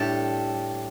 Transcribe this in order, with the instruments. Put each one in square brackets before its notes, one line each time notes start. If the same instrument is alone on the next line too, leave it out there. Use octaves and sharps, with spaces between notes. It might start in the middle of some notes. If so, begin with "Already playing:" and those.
Already playing: [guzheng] A2 G3 D4 G4 A4